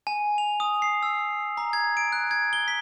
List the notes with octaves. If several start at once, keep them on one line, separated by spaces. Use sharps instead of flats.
G#5
F7
D#6
C7
E6
A#5
G#6
D7
F#6
G#6
G7
B6